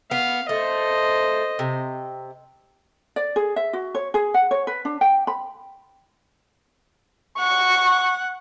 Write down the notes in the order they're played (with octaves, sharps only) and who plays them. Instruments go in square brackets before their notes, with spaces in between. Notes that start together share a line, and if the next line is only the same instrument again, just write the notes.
[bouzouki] B3 [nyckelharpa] F5
[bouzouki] A3 [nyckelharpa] C5 D#5
[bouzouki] C3
[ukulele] D5
G#4
E5
F#4
C#5
G#4
F#5
C#5
B4
D4
G5
B5
[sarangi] F#5 [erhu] C#6